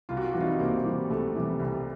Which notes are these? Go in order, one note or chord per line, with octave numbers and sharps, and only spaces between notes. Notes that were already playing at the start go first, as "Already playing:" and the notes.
C2 F4
F#4
F4
C3 E3 G3 F#4
D#4 F4
C2 A#3 C4
C3 E3 G3
C2 A3
C3 E3 G3
C2